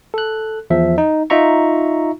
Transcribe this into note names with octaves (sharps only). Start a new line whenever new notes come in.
A4 F#6
E2 F3 E5
D#4
D#4 F4 E5 A#5 C#6